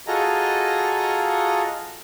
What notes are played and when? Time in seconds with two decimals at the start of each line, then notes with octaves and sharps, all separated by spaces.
0.07 F4 F#4 G#4 A4 D#5 A#5